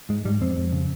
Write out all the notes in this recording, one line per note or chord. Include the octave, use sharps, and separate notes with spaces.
G#2 G#3
G#2 G3
F2 C4
F2
C#3